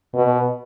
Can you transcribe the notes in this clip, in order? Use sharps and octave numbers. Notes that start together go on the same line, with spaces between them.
B2